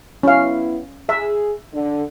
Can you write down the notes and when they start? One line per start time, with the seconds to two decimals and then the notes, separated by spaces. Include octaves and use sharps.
0.23 B3 C#4 E4 F5
1.09 G#4 E5
1.73 D3